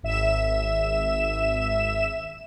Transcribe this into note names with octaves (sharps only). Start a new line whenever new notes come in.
G#1 E5 E7